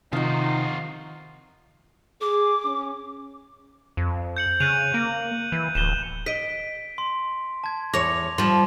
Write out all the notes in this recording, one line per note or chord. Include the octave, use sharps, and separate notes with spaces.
C3 D#3 F3 D#4 F4 F#4
G#4 D6
C#4
F2
G6 C#7 F#7
C#3 F#6 D#7 F7
A#3
E3
D1 E7 G7
D#5 B6 D7
C6
A5 G#6
E2 C#5 D6 A#6 F7
F3 G3 C6 E7